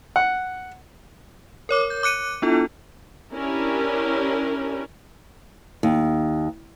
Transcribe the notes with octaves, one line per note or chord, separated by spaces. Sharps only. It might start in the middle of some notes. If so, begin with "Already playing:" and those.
F#5
A#4 C#5 D6
G6
D6 F#6 C#7 D#7
B3 D4 E4 F4 A4
C#4 D4 E4 G4 A#4
D#2